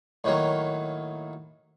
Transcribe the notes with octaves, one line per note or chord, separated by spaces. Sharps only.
A2 D#3 F#3 A#3